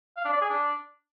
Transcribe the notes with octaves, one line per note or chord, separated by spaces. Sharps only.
F5
D4
D5
G#4
D4